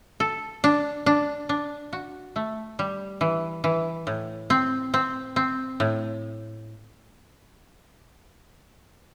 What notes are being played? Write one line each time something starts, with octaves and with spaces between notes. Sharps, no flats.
A4
D4
D4
D4
F#4
A3
G3
E3
E3
A2
C4
C4
C4
A2